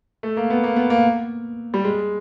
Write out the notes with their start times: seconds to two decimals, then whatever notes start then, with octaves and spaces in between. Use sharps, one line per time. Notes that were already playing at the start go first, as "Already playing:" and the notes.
0.23 A3
0.37 A#3
0.50 B3
0.64 A#3
0.76 B3
0.90 A#3
1.74 G3
1.85 G#3